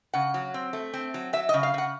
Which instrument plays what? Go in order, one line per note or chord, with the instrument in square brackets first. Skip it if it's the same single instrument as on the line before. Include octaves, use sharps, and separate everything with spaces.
[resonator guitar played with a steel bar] C#3 F#5
F#3
C4
A3
C4
F#3
F#3 E5
D#5
C#3
F5
C#3 F#5